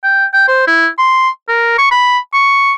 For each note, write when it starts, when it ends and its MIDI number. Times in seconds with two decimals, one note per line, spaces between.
0.03 0.25 79
0.33 0.45 79
0.48 0.63 72
0.67 0.87 64
0.99 1.29 84
1.49 1.77 70
1.78 1.88 85
1.91 2.18 83
2.33 2.74 85